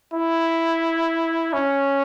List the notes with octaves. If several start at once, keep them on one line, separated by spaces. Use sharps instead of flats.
E4
C#4